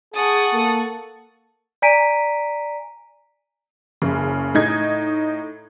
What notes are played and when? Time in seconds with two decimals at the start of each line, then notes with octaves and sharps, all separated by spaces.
0.14 G#4 F#5 A5 C#6 D#6
0.53 A#3 A4
1.82 D5 G#5 A#5 B6 D7 D#7
4.02 F#1 C#3
4.54 A2 D#4 G#6